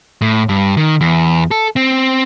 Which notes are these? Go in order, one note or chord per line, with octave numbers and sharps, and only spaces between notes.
A2
G2
D#3
E2
A4
C4